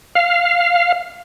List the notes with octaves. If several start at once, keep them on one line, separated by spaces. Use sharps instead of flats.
F5